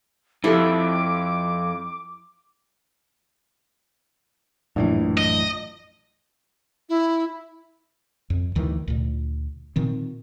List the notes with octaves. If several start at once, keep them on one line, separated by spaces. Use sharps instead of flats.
F2 E4 G4 A4 D6
A#1 F#2 A2 E3
D#5
E4
F2
D2 D#3 E3
D2 A#2
A#2 D#3 C4